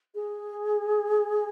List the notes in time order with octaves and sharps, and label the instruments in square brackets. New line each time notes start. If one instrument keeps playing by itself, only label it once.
[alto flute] G#4